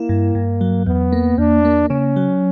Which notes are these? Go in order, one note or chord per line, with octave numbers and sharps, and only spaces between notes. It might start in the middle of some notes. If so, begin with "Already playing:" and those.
Already playing: A#3 E4
G2
G2
F#3
E2 B3
A#3
E2 D4
A#3
C#3 C#4
F#3